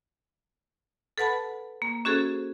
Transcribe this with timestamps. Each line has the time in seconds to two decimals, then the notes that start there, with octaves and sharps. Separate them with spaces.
1.18 A4 B4 F#5 A5 B5
1.82 A#3
2.05 C#4 F#4 G#4 A4 C5